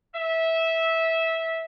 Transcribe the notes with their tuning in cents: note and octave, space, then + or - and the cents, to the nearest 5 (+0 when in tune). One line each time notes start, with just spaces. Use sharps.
E5 -15